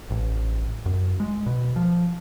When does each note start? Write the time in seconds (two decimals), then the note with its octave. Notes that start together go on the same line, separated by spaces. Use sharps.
0.11 A1
0.86 F#2
1.20 G#3
1.46 B2
1.76 F3